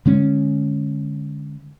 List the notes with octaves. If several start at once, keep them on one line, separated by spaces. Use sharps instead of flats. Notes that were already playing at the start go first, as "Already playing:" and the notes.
D3 G#3 C#4